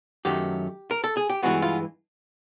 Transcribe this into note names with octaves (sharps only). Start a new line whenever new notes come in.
F#2 D#3 F#3 A3 G4
A#4
A4
G#4
G4
G2 E3 G#3 B3 F#4
F4